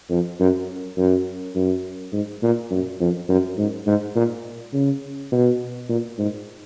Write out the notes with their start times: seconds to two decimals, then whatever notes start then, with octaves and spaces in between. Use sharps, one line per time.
0.10 F2
0.40 F#2
0.97 F#2
1.55 F#2
2.13 G#2
2.42 A#2
2.71 F#2
3.00 F2
3.29 F#2
3.58 G#2
3.87 G#2
4.15 A#2
4.73 C#3
5.32 B2
5.89 A#2
6.18 G#2